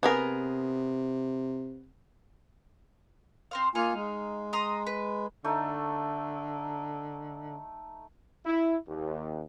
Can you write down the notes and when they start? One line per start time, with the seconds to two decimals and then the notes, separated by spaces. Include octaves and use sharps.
0.03 C3 B3 G#4 A#4
3.51 C4 C5 F5
3.75 A#3 D#4 F4 F5 G#5
3.94 G#3
4.53 A#5 C6 D#6
4.87 B4
5.44 D3 A3 D#4
8.46 E4
8.89 D#2